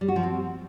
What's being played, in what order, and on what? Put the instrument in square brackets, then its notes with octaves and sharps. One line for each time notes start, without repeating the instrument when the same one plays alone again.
[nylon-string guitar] G3
F#4
F3
C4